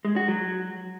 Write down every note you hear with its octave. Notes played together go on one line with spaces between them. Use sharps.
G#3
F#4
F#3